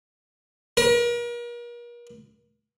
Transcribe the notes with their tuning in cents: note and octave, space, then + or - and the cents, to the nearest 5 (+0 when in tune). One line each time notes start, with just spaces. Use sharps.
A#4 +40